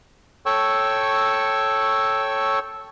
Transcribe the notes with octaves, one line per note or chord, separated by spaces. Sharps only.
A4 C#5 G5 C#6 E6